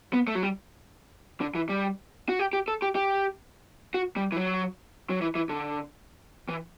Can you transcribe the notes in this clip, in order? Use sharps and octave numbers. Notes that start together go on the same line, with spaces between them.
B3
A3
F#3
G3
D3
E3
G3
F#4
G4
G4
A4
G4
G4
F#4
G3
E3
F#3
F#3
E3
E3
D3
E3